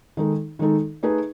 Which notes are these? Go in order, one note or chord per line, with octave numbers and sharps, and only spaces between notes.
D#3 G#3 D#4 A4
D#3 G#3 D#4 A4
A3 D#4 G#4 B4